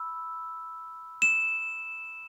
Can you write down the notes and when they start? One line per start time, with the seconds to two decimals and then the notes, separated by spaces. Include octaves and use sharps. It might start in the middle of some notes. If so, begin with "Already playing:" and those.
Already playing: B5 E6
1.22 E7